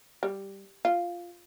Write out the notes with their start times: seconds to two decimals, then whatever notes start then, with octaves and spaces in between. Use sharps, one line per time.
0.23 G3
0.85 F4